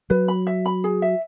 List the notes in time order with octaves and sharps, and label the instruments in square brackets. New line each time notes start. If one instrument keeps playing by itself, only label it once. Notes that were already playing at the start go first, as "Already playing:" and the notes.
[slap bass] F#3 [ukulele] B4
[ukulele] B5
E5
B5
G#4
E5